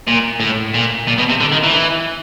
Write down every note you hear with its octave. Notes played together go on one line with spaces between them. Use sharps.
A#2
A2
A#2
A#2
B2
C3
D3
D#3
E3